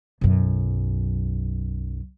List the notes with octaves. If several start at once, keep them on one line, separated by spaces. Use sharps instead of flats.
B1 F#2